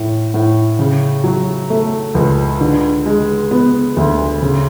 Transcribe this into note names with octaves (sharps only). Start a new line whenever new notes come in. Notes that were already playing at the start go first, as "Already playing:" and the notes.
Already playing: A2
A2
C#3
F#3
A3
C#2
D3
G#3
B3
D2
C#3